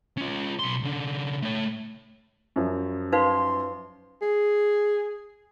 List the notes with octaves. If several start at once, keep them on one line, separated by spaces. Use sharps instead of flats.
C#4 F4
B1 C6
C#3 D4
A3 C#5
F#2 F3
D#4 B4 F5 C6
G#4